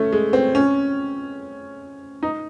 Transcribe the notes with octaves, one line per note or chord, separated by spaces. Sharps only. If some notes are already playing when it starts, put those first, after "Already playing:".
Already playing: A3 C#4
G#3
C4
C#4
D#4